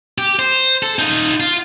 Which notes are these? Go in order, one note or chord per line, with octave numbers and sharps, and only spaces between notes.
G4
C5
A4
D#4 F4
F4